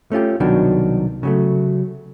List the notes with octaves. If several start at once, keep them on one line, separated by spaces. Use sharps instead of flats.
A3 C#4 F4 G4
C2 B2 D#3 F#3 D4
C#3 F#3 A3